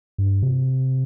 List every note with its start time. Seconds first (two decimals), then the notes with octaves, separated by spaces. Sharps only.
0.18 G2
0.42 C3